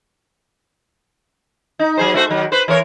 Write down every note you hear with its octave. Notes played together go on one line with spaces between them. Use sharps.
D#4
F#3 G#4 C5
A3 F#4 C5
D#3 F#3
B4 C5
E3 A#4 C#5